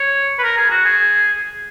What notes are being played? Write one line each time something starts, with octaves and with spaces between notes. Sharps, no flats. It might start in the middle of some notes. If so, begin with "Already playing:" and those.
Already playing: C#5
B4
A#4
G#4
F#4
G#4